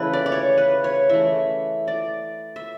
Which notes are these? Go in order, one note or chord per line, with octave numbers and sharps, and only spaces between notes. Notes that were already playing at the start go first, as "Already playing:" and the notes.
Already playing: C#3 E3 A3 B4 E5
D5
D5
C#5
B4
C#5
E3 A3 E5
D5
E5